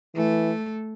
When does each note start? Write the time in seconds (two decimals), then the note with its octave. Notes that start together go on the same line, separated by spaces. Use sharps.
0.16 E3 A3